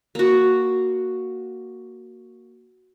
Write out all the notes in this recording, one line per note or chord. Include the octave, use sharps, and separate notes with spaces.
A#3 F#4